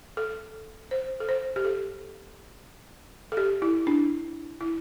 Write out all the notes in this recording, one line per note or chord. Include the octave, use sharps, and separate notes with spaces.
A4
C5
A4
C5
G4
A4
A4
G4
E4
D4
E4